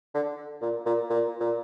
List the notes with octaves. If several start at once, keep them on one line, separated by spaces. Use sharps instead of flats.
D3
A#2
A#2
A#2
A#2